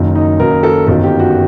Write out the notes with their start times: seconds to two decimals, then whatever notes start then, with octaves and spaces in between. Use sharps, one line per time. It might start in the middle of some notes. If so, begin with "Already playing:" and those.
Already playing: F#1 F#2 D#3
0.15 D#4
0.39 F#1 F#2 D#3 A#4
0.63 A4
0.87 G1 F#2 D#3 A4
1.03 G4
1.19 F#4